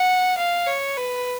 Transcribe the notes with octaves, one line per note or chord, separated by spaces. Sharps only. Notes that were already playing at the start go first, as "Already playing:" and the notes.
Already playing: F#5
F5
C#5
B4